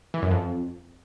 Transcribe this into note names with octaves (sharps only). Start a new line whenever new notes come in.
E3
F#2
F2